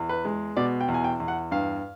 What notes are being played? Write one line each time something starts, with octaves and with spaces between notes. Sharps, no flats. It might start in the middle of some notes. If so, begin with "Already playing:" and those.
Already playing: E2
B4
G#3
B2 D5
G5
E2
G#5
G5
E2
F#5
G2 F5